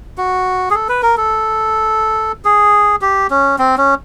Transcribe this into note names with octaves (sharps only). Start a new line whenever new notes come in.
F#4
G#4
A4
B4
A#4
A4
G#4
G4
C#4
C4
C#4